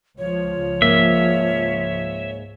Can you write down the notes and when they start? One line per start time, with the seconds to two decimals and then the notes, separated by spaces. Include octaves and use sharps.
0.18 C#2 F3 C#5
0.82 G#2 A#3 E5